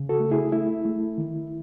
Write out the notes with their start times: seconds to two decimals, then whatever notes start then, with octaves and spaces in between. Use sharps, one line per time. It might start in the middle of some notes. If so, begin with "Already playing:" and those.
Already playing: C#3
0.09 F#4 A4
0.20 A3
0.31 E4 G#4
0.52 A3 E4
0.85 A3
1.18 D#3